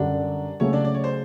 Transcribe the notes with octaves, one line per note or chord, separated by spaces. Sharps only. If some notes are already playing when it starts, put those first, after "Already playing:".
Already playing: F#2 D3 G3 D4 D5
C#3 F#3 A3 C#4 C#5
D4 D5
D5
C#5
C5